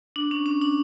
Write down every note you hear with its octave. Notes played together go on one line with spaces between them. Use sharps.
D4
C#4
C#4
D4